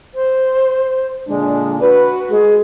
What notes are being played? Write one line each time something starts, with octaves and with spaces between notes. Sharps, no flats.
C5
A#2 D3 G#3 D4
F#4 B4
G#3 G#4